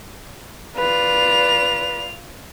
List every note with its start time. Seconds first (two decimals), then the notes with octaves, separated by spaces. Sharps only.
0.77 F4 B4 D5 F7